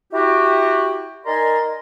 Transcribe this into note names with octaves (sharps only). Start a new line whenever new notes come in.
E4 F#4 G4
D#4 A#4 D5 G#5 A#5 C6